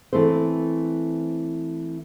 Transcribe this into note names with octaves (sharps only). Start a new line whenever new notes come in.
E3 A3 C4 C5